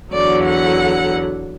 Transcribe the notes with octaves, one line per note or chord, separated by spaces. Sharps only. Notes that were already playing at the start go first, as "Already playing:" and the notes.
E2 D3 F#3 D5
F#5